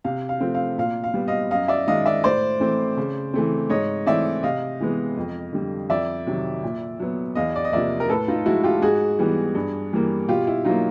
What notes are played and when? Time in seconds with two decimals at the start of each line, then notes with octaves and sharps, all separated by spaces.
0.04 C3 F5
0.29 F5
0.40 F3 A3 C4
0.54 F5
0.78 A#2 F5
1.04 F5
1.14 G3 B3
1.28 D#5 F5
1.51 F#2 D#5 F5
1.68 D5 E5
1.87 D#3 G#3 D#5 F5
2.06 D5 E5
2.23 A2 C5 D5
2.60 E3 A3 C4
2.97 C#3
3.34 E3 A3 C4
3.70 G#2 C#5 D#5
4.06 E3 A3 C4 D5 E5
4.43 C3 D#5 F5
4.80 E3 G#3 B3
5.17 F2
5.53 D3 G3
5.89 F2 D5 E5
6.27 C3 D#3 F#3
6.63 A#2
7.00 F#3 B3
7.35 E2 D#5 F5
7.55 D5
7.65 D#5
7.72 C3 F3 A#3 D5 E5
8.00 A#4
8.09 A2 A4 B4
8.28 D#4 F4
8.46 F3 G#3 E4 F#4
8.63 F4 G4
8.82 G#2 F#4 G#4
9.19 E3 G3 B3
9.55 G2
9.93 E3 G3 A#3
10.28 B2 F4 G4
10.47 E4
10.65 F#3 A#3 D#4 F4